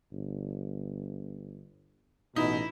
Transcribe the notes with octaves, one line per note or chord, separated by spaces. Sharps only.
G1
A1 B2 D#4 E4